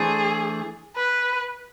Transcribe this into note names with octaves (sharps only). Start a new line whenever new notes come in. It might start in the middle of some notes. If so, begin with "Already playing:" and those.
Already playing: E3 A3 D4 G#4 A4 C5
B4